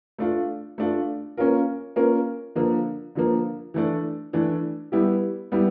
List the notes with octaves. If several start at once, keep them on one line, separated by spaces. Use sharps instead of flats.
A3 D4 F4
A3 D4 F4
A#3 C#4 F4 A#4
A#3 C#4 F4 A#4
D3 F3 A#3
D3 F3 A#3
E3 A3 D4
E3 A3 D4
G3 B3 E4 G4
G3 B3 E4 G4